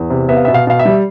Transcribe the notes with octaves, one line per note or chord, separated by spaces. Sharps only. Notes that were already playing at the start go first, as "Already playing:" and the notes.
Already playing: E2
C3
B3 E5
F5
B2 E5
F5
B2 F5
E5
G3